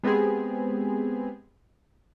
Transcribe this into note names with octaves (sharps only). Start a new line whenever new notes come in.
G#3 B3 C4 G4 G#4